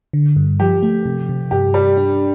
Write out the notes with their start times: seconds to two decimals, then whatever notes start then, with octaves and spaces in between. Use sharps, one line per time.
0.13 D3
0.36 G2
0.60 F3 G4
0.83 A3
1.06 C3
1.29 C3
1.51 G2 G4
1.74 G2 G3
1.98 D4